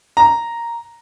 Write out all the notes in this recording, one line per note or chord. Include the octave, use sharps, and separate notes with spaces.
A#5